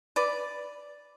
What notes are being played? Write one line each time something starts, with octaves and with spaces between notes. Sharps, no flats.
B4 D5